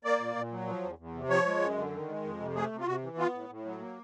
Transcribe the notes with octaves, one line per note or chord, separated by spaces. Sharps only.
A#3 D5
A#2
A#2
F#3
F3
E2
E2
C3
F3 C#5
G#3
F#2
D3
D#3
G#3
F2
C3
A3 G#4
C3
F4
C3 F#4
E3
B3 F4
A2
A2
F#3
A#3